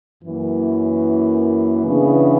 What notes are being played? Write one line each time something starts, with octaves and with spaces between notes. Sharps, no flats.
F#2 E3 A#3
C#3 E3 B3 D4